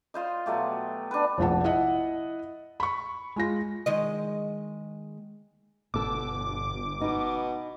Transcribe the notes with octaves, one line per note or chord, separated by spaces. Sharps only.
F4 C5 D#5
B2 F#3 A3 G4
D4 B4
F1 A#1 F#5 A5
E4 D#5 F#5
B5 C#6
G#3 F4 A#6
D#3 G#3 D#5
G1 B2 A4 D6
B2 D#4